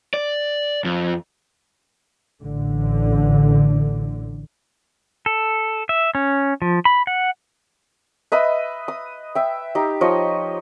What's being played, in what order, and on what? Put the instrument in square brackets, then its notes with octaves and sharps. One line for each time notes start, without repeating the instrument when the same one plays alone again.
[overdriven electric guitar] D5
F2
[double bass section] A1 D3
[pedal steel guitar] A4
E5
C#4
F3
B5
F#5
[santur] B4 D#5 E5 B5
D#6
E5 G5
D#4 G4
F3 C#5 D#5